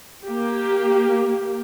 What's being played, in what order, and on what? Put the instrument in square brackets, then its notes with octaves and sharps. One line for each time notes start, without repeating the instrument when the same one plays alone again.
[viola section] A#3 G4